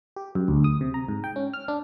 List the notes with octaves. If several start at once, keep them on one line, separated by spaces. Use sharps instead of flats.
G4
F#2
D2
D#6
C3
A#5
G#2
G5
C#4
F6
D4